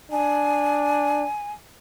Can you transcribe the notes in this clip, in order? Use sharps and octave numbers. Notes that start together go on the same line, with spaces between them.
D4 G#5